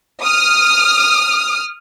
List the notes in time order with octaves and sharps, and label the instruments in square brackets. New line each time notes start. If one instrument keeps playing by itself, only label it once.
[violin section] D#6 F6